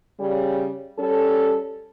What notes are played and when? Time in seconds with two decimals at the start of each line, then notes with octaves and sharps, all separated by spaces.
0.19 C#3 G3
0.98 G3 C#4 A4